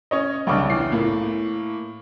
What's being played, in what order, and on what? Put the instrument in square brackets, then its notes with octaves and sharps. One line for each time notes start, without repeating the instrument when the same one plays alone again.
[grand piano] C#4 C#5 D#5
[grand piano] C2 C#3 D4 [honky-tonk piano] G5 C#6 D6
[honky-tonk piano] E2 [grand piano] C7
[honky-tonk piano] A2 A#3